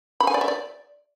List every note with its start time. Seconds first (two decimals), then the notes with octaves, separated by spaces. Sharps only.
0.20 B5
0.27 G#5
0.34 D5
0.41 E5
0.48 D5